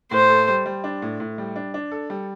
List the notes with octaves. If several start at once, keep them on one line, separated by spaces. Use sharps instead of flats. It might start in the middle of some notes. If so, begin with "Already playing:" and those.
A2 C5
A4
G3
G3
D4
A2
A2
G3
D4
D4
A4
G3